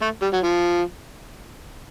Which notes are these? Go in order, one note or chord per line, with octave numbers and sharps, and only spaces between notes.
A3
G3
F#3
F3